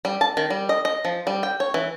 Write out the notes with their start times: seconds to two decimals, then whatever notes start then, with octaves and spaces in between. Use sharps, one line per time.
0.05 G3
0.21 A5
0.37 D#3
0.50 G3
0.69 D#5
0.85 D#5
1.05 F3
1.27 G3
1.43 G5
1.60 C#5
1.74 E3